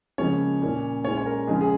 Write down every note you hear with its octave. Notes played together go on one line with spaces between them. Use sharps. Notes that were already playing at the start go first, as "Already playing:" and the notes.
C#2 C#3 F3 A#3 C#4 C#5
A#2 A#3 C#4
A#2 G#3 C#4 C#5
C#5
A#4
C#2 C#3 F3 G#3 C#4 G#4
G#4